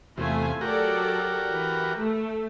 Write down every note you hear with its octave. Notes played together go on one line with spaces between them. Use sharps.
E2 C3 A3 F4 G#5
F#3 F#4 G4 A4 A#4 D5
E3 B4
A3